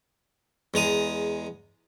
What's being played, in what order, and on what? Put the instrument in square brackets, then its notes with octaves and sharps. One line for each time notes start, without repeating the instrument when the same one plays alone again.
[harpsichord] E2 G#3 A#5 D#6